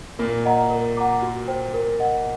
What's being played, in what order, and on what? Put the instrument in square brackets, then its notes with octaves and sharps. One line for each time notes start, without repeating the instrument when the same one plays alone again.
[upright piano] A#2 A#3 [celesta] A#4
[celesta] D#5 F#5 A#5
A#4
F#5 A#5 D6
F#4
C5 G5
A#4
D#5 F#5